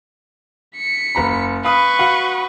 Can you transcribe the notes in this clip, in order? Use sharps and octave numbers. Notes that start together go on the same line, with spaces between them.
B6 C#7
F#1 A#5 B5
B4 F5 B5 C#6 D#6
F#4 F5 F#5